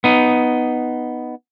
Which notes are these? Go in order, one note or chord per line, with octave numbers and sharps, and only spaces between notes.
B3 D#4